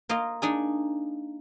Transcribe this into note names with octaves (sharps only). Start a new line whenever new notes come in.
A#3 F4 D#5
D4 D#4 G#4